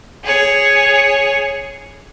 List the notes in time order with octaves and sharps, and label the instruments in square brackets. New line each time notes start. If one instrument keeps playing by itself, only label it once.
[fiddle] G#4 C#5